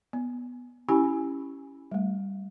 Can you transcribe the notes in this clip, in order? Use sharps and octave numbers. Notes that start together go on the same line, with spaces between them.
B3
C#4 E4 G4 G#5 B5
G3 A3